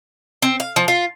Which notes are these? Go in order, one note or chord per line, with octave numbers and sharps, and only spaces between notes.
C4
F5
F3
F4